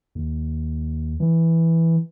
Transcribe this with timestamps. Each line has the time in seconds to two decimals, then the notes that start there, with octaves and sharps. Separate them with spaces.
0.15 D#2
1.20 E3